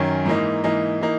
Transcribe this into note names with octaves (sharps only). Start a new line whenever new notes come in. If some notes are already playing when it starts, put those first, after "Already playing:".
Already playing: F#2 D#3 C#4
G#2 E3 A#3 D#4
G#2 E3 A#3 D#4
E3 A#3 D#4